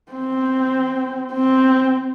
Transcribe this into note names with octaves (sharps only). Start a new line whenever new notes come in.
C4
C4